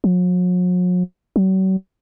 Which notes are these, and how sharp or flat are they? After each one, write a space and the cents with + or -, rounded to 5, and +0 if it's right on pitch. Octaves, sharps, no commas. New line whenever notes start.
F#3 -45
F#3 +40